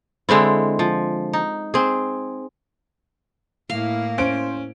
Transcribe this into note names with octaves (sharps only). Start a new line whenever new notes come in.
D3 G#3 C4 E4
F3
D#4
C4 G#4
A2 A#3 E4 F5
C#4 C5 D7